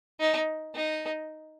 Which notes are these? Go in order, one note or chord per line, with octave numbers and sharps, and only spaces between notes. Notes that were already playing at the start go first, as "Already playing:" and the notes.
D#4
D#4